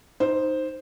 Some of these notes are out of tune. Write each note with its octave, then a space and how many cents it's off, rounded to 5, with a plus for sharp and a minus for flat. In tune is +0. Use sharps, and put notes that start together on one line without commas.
D#4 +0 C5 +0